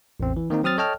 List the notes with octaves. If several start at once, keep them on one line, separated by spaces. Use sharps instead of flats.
A1 E2 C4
E3
D#3 A#3 C4 D#4
F#3 C4 D#6 F6 A6
A4 C#5 D#5 G5 A5 F6